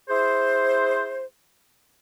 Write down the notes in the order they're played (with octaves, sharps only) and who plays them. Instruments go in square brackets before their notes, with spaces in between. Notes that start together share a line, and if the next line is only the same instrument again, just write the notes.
[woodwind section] E4 G#4 C5